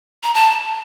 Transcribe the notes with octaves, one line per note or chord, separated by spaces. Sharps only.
A#5
A5